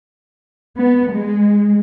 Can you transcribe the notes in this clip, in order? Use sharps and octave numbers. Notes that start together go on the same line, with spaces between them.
B3
G#3